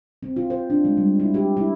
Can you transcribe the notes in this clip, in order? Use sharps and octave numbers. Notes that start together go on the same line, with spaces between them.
C4
F4
C5
D4
G#3
G3
E4
G4
E4